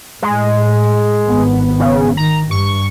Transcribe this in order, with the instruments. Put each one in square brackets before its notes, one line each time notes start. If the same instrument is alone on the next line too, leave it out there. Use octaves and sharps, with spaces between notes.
[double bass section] A2 [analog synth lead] G#3
[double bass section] G#1 B3
[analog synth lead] C#3
[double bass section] D#3 [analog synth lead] A#5
[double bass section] G2 [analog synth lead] C#6